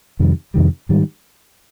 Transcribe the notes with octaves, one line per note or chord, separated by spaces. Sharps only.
F2 C3 D#3 G3
F2 C3 D#3 G3
G#2 D#3 G3